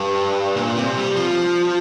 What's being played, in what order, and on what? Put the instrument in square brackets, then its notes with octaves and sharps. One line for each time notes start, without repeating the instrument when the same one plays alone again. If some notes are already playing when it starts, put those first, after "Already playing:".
Already playing: [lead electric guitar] G2
A#2
C3
G3
F3